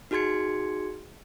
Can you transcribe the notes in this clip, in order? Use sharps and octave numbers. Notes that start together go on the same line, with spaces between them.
D#4 F#4 G#4 C6 G#6 C#7